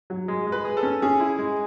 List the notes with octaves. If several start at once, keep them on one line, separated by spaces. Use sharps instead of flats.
F#3
G#3
G#3
B4
G#4
A4
C#4
C#4 G#4
E4
G#3